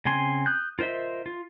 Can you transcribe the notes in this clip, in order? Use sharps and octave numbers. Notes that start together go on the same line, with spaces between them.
C#3 C4 G#5 C6
D#6 F#6 G6
F4 A#4 C5 D#5 E5
F4